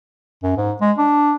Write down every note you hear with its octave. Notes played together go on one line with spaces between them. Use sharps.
F#2
G#2
G#3
D4